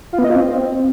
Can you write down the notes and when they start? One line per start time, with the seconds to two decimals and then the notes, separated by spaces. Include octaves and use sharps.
0.13 F4
0.19 B3
0.24 D#5
0.30 F4
0.36 C4